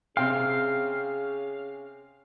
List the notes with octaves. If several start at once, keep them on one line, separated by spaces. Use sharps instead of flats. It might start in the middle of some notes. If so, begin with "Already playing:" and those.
C3 C#4 G#4 F5 G5